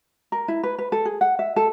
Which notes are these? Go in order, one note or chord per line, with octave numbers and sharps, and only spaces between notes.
A#4
E4
B4
B4
A4
G#4
F#5
E5
A4